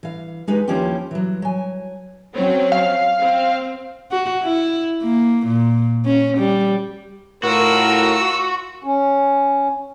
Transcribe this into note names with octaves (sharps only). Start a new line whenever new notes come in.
E3 F5
G#3 D#4 G4 B4
D#2 F3 C#4 E4 G4 G5
E3 F#3
F#3 G#5
F#3 C4 C#4
F5
C4
F#4
E4
A#3
A#2
C#4
G3
A2 F4 F#4 A#4 E6
C#4